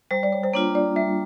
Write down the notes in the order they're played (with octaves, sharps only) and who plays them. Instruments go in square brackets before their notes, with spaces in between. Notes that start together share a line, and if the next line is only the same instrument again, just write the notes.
[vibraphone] G3 [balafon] C5
[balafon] D5
C#5
C5
[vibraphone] A#3 D4 F4 [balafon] C#5
[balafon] D5
[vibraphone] G3 [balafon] E5